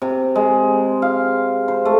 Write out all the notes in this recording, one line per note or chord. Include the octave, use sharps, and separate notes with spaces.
C3
G#3
F5
C5
A3